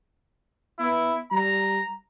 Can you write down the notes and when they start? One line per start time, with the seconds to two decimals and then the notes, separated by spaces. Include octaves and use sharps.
0.79 B3 E4
1.32 G3 A#5